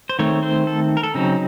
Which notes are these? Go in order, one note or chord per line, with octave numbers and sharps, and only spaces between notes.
C5
D#3 A3 C4 C#5
C5
A4
A#4
A4
C#3 F#3 C4 D#4